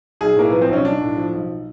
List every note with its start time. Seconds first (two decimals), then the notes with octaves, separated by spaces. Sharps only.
0.21 B1 G#4
0.37 A2 A#3
0.50 F3 B3
0.62 C4
0.69 B1 C#4
0.85 B1 D4
1.01 A2
1.17 F3
1.32 B1